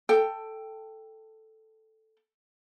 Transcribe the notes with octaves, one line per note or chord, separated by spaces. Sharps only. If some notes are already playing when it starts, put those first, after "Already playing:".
A4 G5